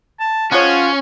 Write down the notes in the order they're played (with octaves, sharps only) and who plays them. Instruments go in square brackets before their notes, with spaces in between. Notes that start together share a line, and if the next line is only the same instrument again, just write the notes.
[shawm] A5
[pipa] F3 G#3 C#5 [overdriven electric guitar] C#4 [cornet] F4 [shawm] F#5